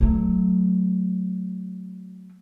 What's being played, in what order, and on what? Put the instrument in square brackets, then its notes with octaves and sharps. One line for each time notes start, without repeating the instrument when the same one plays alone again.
[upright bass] F#3 A3